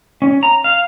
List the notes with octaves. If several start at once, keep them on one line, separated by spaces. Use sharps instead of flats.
C#4
A#5
F5